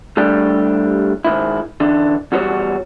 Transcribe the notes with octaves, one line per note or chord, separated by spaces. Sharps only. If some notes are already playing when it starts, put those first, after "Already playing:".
A2 G3 A3 D4 G4
G#2 D#3 E4
D3 E3 D4
E2 G3 F#4 B4 C#5